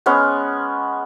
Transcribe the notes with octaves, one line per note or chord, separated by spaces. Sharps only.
G#3 B3 C#4